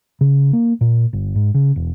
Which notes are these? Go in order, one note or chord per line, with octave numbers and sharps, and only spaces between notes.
C#3
A#3
A#2
G1
G#2
C#3
E1